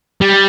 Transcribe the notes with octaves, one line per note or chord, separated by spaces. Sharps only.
G3